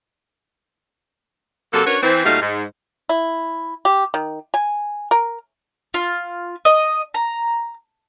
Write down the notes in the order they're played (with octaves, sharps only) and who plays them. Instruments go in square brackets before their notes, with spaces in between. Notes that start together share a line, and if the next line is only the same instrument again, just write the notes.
[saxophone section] C3 F#3 A#3 A4
C#4 D4 F#4 A#4 B4 C#5
E3 C4
A#2 G3 A3 D#4 F#4 F5
G#2
[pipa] E4
G4
D#3
G#5
A#4
[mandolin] F4
D#5
A#5